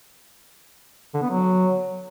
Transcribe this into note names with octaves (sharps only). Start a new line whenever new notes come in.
D3
B3
F#3